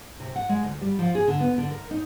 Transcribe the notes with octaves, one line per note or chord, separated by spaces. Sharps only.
C3
F#5
G#3
D2
G3
F3
G#4
D3
B3
D3
A#4
D#4